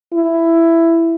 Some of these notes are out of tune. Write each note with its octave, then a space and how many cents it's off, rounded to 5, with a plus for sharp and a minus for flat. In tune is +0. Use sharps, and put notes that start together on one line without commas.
E4 +10